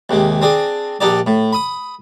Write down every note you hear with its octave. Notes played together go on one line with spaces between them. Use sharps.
D#2 C3 G#3
C4 D4 G#4
A#1 D4 D#4 G4 D5
A2
B5 D#6